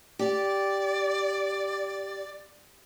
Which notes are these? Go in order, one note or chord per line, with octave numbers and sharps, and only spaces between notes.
G4 D5